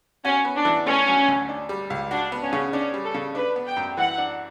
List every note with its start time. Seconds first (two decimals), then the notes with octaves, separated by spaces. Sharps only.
0.25 C#4 F#4
0.45 B3
0.55 D4
0.65 E3
0.86 A3 C#4
1.07 F#3
1.28 D2
1.49 D4
1.69 G3
1.90 C#2
2.11 D4 F#4
2.32 B3
2.43 C#4
2.53 C#3
2.73 C#4 D4
2.94 G3
3.04 A4
3.14 C#3
3.35 D4 B4
3.56 B3
3.67 G5
3.76 F#2
3.97 E3 F#5
4.18 D4